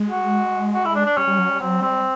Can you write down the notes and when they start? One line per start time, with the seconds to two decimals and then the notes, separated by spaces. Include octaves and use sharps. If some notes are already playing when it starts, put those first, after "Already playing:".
Already playing: G#3
0.09 F#4
0.74 F#4
0.85 E4
0.95 D4
1.06 D4
1.17 G3 C#4
1.28 G3
1.38 F#3
1.50 G3
1.60 F#3 C4
1.81 G3 C4